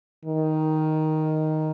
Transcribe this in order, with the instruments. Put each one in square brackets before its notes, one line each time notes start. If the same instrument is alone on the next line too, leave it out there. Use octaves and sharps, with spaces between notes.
[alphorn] D#3